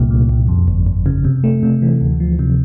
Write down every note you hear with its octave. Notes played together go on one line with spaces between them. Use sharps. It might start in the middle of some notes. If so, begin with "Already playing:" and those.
Already playing: C2 A#2
A#2
C2
F2
G1
G1
C#3
C3
A3
C3
E3
D2
F3
C3